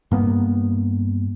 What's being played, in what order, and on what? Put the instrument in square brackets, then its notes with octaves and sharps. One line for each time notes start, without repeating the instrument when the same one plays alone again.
[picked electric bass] G2 A#3 B3